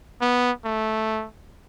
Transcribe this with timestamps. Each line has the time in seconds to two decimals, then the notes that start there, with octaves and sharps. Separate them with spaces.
0.21 B3
0.65 A3